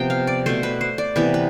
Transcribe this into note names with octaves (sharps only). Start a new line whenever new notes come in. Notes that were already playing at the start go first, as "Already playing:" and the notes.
Already playing: C3 F3 B3 G5
F5
D5
B2 A3 C5
B4
C5
D5
C3 E3 B3 B4
B4